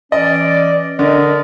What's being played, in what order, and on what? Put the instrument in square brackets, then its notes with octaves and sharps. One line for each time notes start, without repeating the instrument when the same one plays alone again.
[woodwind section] E3 C#4 D5 [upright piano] D#5
[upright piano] D3 [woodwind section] A#4 D5 D#5